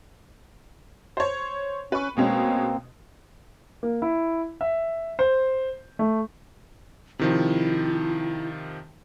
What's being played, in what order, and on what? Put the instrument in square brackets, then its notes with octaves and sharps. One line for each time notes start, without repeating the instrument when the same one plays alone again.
[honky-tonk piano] C5 C#5
[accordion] C#4 [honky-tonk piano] B4 C#6
[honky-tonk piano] B2 G#3 C#4 [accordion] A#3 C4
[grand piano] A#3
E4
E5
C5
A3
[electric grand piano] C3 D#3 F3 [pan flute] E4